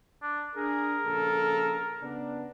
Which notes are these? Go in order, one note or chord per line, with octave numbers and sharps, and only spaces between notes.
D4
D4 G#4 A#4
A#1 C#3 A4
C#3 B3 D4